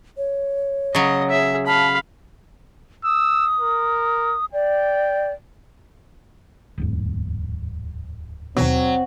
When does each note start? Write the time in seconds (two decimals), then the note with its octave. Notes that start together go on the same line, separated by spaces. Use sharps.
0.17 C#5
0.95 C#3 F#3 D#5
1.29 G#4 E5
1.67 F5 A5 B5
3.05 D#6 E6
3.60 A#4
4.53 D5 G5
6.78 D1 E2 G#2
8.57 D#2 B2 F#3 C4